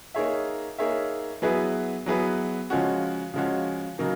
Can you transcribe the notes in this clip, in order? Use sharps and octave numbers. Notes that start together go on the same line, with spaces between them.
A#3 D#4 G#4 C#5 E5
A#3 D#4 G#4 C#5 E5
F#3 B3 E4 G#4 B4
F#3 B3 E4 G#4 B4
C#3 F3 G#3 C#4 F#4
C#3 F3 G#3 C#4 F#4
C#3 F#3 A#3 D#4